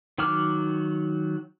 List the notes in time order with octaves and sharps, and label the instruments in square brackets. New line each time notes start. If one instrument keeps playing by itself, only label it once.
[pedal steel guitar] D#3 F#3 F#4 D6 F6